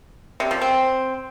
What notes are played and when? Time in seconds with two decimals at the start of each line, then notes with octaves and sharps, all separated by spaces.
0.40 C3
0.51 F3
0.61 C4